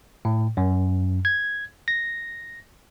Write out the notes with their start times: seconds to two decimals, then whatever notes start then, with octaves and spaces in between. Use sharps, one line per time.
0.25 A2
0.57 F#2
1.25 G#6
1.88 A#6